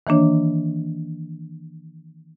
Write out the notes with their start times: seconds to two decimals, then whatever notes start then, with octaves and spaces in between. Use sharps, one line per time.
0.07 D#3 E3 A#3 D4 C#5